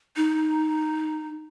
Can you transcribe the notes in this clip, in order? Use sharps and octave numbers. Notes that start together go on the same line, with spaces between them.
D#4